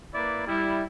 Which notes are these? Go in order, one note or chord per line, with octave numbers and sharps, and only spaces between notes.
A#3 E4 B4 D5
G3 E4